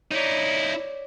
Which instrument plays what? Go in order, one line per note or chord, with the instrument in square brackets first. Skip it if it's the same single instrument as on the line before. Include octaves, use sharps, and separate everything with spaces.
[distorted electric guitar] D#4 E4 [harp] C#5 D5